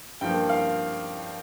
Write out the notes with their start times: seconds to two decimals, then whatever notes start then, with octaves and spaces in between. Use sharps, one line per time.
0.21 G2 F3 A#3 G5
0.49 F5